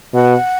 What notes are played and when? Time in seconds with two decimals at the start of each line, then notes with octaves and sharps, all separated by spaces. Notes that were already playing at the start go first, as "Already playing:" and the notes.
0.14 B2 F#5